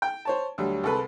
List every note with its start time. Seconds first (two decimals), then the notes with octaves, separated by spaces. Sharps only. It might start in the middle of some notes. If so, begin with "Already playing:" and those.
0.02 G5
0.25 C5 C#5 A5
0.58 D2 F#3 G3
0.83 C2 G#3 A4 B4